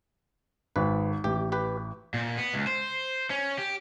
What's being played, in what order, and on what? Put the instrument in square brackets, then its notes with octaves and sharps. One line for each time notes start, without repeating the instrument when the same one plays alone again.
[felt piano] G#1 [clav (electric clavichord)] B4
[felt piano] A1 [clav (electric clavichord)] G4
[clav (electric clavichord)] G4 B4
[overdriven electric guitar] A#2
B3
C#2
C5
C#4
G4